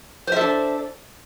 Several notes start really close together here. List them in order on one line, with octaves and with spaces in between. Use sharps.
C5 E5 A4 D4